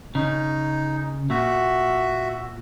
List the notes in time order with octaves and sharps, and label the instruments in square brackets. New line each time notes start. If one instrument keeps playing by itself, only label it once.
[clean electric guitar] C#3 [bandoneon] D#4
[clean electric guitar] A#2 [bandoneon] F#4 E5